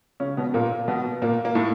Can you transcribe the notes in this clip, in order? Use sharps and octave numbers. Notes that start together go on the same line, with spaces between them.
C#3 C#4
B2 B3
A#2 A#3
B2 B3
A#2 A#3
A#3
A2 A3